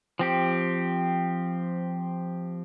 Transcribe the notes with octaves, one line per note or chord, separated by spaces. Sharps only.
F3 C4 G4